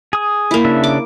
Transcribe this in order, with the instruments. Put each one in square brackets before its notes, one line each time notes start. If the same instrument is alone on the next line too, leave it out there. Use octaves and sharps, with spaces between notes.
[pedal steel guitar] G#4 D#6
[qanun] A#3 E4
[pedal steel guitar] C#3 D4 E5
[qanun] D6